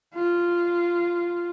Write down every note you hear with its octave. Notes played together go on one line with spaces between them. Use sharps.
F4